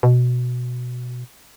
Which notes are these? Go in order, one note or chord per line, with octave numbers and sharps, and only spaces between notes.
B2